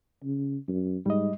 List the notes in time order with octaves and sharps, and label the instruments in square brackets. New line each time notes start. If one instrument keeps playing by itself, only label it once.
[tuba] C#3
F#2
[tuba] G#2 [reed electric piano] G3 D#5